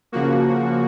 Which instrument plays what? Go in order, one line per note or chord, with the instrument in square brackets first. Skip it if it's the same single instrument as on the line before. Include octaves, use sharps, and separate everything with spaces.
[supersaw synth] C#3 F3 A#3 F#4